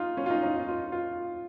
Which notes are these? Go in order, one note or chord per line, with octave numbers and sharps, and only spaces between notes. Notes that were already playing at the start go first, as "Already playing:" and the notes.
Already playing: D#4 F4
C#4
F4
D#4
D#4
F4
F4
F4